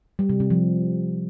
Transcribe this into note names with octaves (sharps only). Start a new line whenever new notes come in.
G3
C3
C3
F3